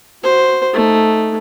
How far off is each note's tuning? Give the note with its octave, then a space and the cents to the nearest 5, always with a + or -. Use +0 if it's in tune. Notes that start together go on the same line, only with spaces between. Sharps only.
F#4 +0 C5 +0
A3 +0 D#4 +0